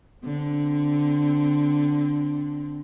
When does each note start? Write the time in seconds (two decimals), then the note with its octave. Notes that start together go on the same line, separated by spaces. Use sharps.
0.24 D3 C4